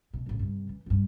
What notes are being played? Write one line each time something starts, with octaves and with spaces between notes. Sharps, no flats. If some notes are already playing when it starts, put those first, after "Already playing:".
B2
A1 A2
G2 C3
E3
B1 G2